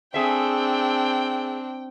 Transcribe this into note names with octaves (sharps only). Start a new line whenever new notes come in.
A3 C4 D4 G#4 E5 G5